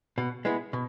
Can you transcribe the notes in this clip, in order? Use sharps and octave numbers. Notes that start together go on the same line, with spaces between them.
B2
G#3 B3 E4
B2